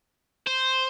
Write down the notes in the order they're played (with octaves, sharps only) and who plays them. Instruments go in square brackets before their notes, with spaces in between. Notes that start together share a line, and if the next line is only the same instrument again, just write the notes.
[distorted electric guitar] C5